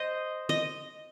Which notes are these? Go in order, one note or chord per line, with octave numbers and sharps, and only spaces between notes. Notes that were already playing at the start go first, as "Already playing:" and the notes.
Already playing: C5 D#5
D#5